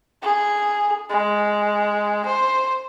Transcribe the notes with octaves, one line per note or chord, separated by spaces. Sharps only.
G#4
G#3
C5